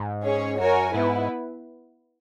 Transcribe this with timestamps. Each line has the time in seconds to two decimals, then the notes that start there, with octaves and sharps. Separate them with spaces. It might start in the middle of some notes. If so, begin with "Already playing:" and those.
Already playing: G#2
0.24 C#4 G#4 C#5
0.60 F#2 F#4 A#4 C#5 G#5
0.94 G#2 B3 E4 B4